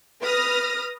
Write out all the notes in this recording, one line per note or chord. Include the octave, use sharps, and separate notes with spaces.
B4 D#6 F6 A#6